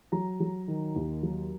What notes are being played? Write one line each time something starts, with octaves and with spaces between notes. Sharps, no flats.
F#3 A#5
F#3
D#3
D#2
F#3